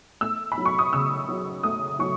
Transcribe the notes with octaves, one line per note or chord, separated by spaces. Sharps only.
A3 E6
B5
F#3
C#6
D#6
C#3 E6
F#3
A3 D#6
F#3 C#6